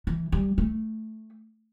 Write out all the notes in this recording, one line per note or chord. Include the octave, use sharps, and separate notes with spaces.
E3
G3
A3